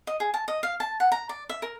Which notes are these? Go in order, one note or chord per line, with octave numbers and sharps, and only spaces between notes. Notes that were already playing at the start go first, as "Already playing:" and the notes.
D#5
G#4
A5
D#5
F5
A5
F#5
A#5
D5
E5
A#4